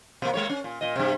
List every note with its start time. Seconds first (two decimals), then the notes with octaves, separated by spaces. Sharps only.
0.22 B2 A#3
0.34 G#3 A#3 C#5
0.49 C#4
0.64 A#2
0.81 A#2 D#5
0.96 G2 C3